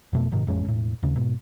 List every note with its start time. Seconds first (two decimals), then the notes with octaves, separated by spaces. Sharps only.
0.13 F2 B2 A3
0.31 F#1 G#2 C3 D#3
0.47 A1 F2 G#3 C#4
0.65 E1 A2
1.03 D#2 C#3
1.16 G#2 B2